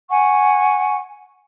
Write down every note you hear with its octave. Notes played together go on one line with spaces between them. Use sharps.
F#5 G#5 C#6